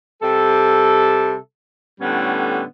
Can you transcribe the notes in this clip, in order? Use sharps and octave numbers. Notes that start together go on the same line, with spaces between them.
C3 G3 A4
A2 D3 G3 B3 C#4